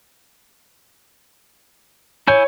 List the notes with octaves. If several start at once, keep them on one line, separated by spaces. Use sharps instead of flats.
E4 C#5 G#5 G6